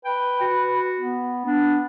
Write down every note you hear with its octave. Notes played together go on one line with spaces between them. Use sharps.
B4 G5
F#4
B3
B3 D4